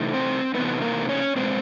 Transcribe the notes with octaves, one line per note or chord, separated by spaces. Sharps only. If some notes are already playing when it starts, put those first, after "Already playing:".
Already playing: C3 E3 A3 D#4
C4 C5
C3 E3 A3 B3 C4 D#4 B4
A#3 A#4
C#4 C#5
B2 G#3 B3 C4 C5